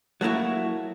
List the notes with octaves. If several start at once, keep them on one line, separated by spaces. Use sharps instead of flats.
F#3 A3 A#3 E4 F#4